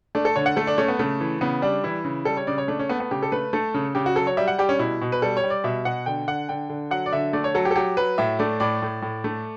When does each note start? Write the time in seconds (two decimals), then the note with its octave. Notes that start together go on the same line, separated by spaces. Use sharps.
0.15 A3 D4
0.25 A4
0.36 D3 C#5
0.46 F#5
0.57 A3 A4
0.67 D4
0.78 A3 C#4
0.88 B3
0.99 C#3 A3
1.20 E3
1.41 C#3 B3
1.62 G3 D4
1.84 E3 E4
2.04 C#3
2.25 G3 A4
2.37 C#5
2.47 C#3 D5
2.58 C#5
2.68 A3 D4
2.79 C#4
2.89 A3 B3
3.00 B3
3.11 C#3 G4
3.23 A4
3.32 A3 B4
3.53 A3 A4
3.74 C#3
3.95 C#3 G4
4.06 F#4
4.16 F#3 A4
4.27 C#5
4.37 G3 E5
4.48 F#5
4.58 G3 G4
4.69 C#4
4.79 B2 E4
5.02 B2
5.12 B4
5.22 G3 A4
5.37 C#5
5.44 G3
5.50 D5
5.64 B2 E5
5.85 B2 F#5
6.06 D3 G5
6.27 D3 F#5
6.49 D3 G5
6.70 D3
6.91 F#3 F#5
7.06 D5
7.13 D3 E5
7.33 A3 D5
7.44 C#5
7.55 F#3 A4
7.65 G4
7.71 A4
7.76 F#3 G4
7.97 F#3 B4
8.18 A2 E5
8.39 A3 D5
8.60 A2 D5
8.82 A2
9.02 A2
9.24 A3